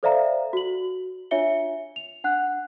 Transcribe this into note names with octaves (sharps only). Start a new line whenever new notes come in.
A4 C5 D5 E5 F5 A#5
F#4 F#7
D4 F4 C#5 E5 C#7 G7
F7
D4 F#5 F#6